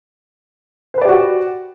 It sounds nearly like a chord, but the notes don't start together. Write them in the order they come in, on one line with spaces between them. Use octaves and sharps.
C5 B4 D5 G4 F#4